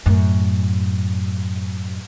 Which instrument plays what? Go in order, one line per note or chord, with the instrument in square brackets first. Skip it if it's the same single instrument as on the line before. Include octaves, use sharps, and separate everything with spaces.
[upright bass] F#2 A2